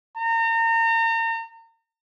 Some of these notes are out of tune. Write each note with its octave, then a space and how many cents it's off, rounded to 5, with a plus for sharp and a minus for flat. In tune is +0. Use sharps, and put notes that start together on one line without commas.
A#5 -35